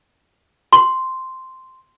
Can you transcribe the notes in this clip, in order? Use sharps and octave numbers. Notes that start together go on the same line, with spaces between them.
C6